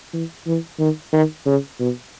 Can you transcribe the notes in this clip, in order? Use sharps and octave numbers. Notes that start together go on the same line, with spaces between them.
E3
E3
D#3
D#3
C#3
B2